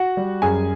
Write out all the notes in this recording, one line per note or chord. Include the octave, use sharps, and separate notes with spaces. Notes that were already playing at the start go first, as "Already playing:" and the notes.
Already playing: F#4 F#5
G3
F#2 G#4 G#5